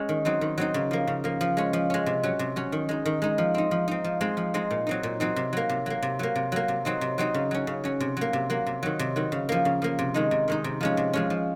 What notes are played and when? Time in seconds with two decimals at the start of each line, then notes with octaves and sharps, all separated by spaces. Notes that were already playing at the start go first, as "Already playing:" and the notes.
Already playing: G#3 C#4
0.09 D#3
0.25 F#3 C4 D#4
0.41 D#3
0.58 F#3 C4 D#4
0.74 C#3
0.91 F3 A#3
1.07 C#3
1.24 F3 A#3
1.41 F3
1.57 G#3 C#4
1.73 F3
1.90 G#3 C#4
2.06 C3
2.23 F#3 C#4
2.39 C3
2.56 F#3 C#4
2.72 D#3
2.89 G#3 D#4
3.06 D#3
3.22 G#3 D#4
3.38 F3
3.54 C4 D#4
3.71 F3
3.88 C4 D#4
4.04 F3
4.21 G#3 C4 D#4
4.37 F3
4.54 G#3 C4 D#4
4.71 A#2
4.87 F#3 C4 D#4
5.03 A#2
5.20 F#3 C4 D#4
5.36 C3
5.53 F#3 A#3
5.69 C3
5.86 F#3 A#3
6.02 C3
6.19 F#3 A#3
6.36 C3
6.52 F#3 A#3
6.68 C3
6.85 F#3 C4 D#4
7.01 C3
7.18 F#3 C4 D#4
7.34 C#3
7.51 F#3 C#4
7.67 C#3
7.84 F#3 C#4
8.00 C3
8.17 F#3 A#3
8.33 C3
8.50 F#3 A#3
8.67 C3
8.83 D#3 F#3
8.99 C3
9.16 D#3 F#3
9.32 C#3
9.49 F3 A#3
9.65 C#3
9.82 F3 A#3
9.99 C3
10.14 D#3 G#3 D#4
10.31 C3
10.48 D#3 G#3 D#4
10.64 C3
10.81 F3 G#3 C#4
10.97 C3
11.13 F3 G#3 C#4
11.30 F3